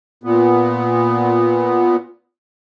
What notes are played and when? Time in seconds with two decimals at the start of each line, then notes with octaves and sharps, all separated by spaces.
0.24 A#2 B3